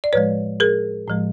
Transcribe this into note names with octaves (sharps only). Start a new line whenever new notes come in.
D5
A2 F3 G#3 B4 C#5
G#4 A#4
A2 F3 G#3